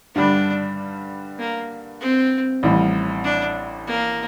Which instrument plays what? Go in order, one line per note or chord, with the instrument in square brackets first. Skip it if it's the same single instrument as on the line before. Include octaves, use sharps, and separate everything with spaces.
[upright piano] G2 D3 G3 [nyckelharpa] D4
[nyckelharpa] A#3
C4
[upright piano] A1 A2 G3
[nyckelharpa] D4
A#3